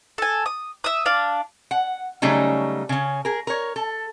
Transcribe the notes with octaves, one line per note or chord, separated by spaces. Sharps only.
A4 G#5
D#6
E5 D#6
D4 F5
F#5
C#3 F#3 G3 A3 C#4 D#4
C#3 C#4
G#4 A#4
A#4 C#5
A4